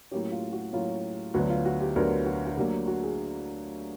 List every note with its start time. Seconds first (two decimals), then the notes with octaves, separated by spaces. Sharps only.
0.11 A2 F#3 A#3 C#4 G4
0.32 F4
0.53 F#4
0.73 A2 F#3 A#3 C#4 F4
1.34 D2 D3 F#3 B3 F#4
1.50 F4
1.65 F#4
1.80 G4
1.96 D2 D3 F#3 B3 A#4
2.26 F#4
2.46 F#4
2.57 D2 D3 F#3 A#3 G4
2.87 F#4
3.03 G#4